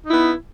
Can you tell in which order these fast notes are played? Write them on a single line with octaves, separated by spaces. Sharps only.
D#4 E4 B3